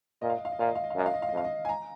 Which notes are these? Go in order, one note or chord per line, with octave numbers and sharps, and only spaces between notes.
A#2 D#5
F5
D#5
F5
D#5
A#2 F5
D#5
F5
D#5
F5
F#2 D#5
F5
D#5
F5
D#5
F2 F5
D#5
G#5
A#5